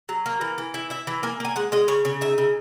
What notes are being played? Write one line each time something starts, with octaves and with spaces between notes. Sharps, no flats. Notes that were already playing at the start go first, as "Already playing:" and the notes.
F#3
A#3
E3
E3
E4
E4 E5
E3
A#3 G#5
A#3 G#5
G#3 F#5
G#3 D#5
C#3 C#5
C#3 C#5
D#4 E5
C#3